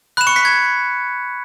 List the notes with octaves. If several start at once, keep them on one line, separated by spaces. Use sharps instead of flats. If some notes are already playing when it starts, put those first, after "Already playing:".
B5 F#6 E7
C#6 C#7
B6
G#6